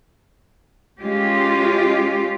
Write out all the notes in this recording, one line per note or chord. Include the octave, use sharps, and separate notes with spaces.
G#3 C#4 F4 G4